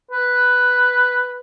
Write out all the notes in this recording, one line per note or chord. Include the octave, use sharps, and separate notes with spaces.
B4